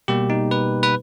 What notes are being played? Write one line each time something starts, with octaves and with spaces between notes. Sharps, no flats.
B2 G3 A#3 G4
D#4
B4
B4